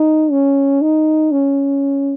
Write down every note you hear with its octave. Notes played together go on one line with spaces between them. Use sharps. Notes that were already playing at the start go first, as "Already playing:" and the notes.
Already playing: D#4
C#4
D#4
C#4